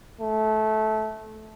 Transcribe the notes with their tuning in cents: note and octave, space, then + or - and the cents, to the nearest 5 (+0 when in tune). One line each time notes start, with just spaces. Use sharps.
A3 -20